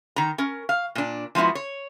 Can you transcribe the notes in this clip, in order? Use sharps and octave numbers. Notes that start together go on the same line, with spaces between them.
D#3 A#5
C#4 A#4
F5
A#2 D4
F3 G#3 B3 E4 F#4
C#5